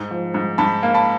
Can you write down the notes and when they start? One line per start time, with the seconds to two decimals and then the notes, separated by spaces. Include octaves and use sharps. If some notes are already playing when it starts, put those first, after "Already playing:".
Already playing: G#2
0.11 F3
0.34 G#2
0.58 G#2 A5 B5
0.83 A#3
0.94 A5 B5